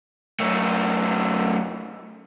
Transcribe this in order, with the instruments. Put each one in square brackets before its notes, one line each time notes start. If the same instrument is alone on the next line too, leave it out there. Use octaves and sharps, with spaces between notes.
[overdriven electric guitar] F#2 A3